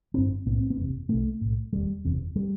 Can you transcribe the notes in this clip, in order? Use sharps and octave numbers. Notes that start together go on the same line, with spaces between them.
G1 G2 C4
B1 A2 B3
C4
B3
F#1 E2 C3
B1 B2 A3
B1 A2
E1 D#2 G3
F#1 E2 C3
G3